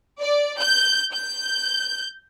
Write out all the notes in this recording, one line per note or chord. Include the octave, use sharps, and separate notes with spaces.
D5
G6
G6